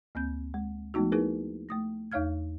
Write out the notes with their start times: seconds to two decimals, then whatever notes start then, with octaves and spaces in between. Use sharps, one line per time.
0.15 D2 A#3 C4 G6
0.54 G#3
0.94 F3 G#3 A3 B3 D#4 F#4
1.12 A#3 D#4 E4 G#4 A#4 B4
1.69 A3 D#6 A#6
2.12 E2 D#4 C#5 F5 F6 G#6